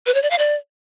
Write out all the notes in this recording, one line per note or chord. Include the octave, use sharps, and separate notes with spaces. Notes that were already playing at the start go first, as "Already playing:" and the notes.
B4
C#5
D5
F5
D5